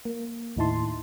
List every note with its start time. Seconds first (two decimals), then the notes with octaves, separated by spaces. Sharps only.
0.05 A#3
0.57 D#2 A2 D#4 E4 A5 C6